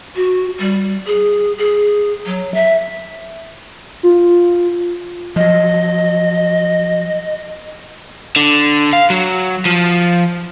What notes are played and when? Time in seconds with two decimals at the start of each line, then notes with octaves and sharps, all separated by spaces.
0.16 F#4
0.59 G3
1.07 G#4
1.58 G#4
2.26 F#3
2.54 E5
4.03 F4
5.36 F3 F#3 D#5
8.36 D3
8.93 F5
9.10 F#3
9.65 F3